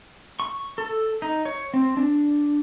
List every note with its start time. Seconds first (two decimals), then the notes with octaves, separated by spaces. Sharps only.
0.40 C#6
0.78 A4
1.22 D#4
1.45 C#5
1.74 C4
1.97 D4